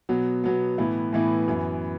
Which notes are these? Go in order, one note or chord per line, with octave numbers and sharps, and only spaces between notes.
B2 F#3 B3
B2 F#3 B3
A2 E3 B3 E4
A2 E3 B3 E4
F#2 E3 B3